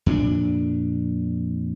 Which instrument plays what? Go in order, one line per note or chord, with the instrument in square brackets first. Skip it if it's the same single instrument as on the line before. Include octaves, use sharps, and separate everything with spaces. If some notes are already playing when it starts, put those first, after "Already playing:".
[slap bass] F2 A#2 B3 D4